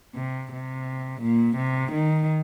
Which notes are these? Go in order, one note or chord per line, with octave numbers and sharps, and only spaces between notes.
C3
C3
A#2
C3
D#3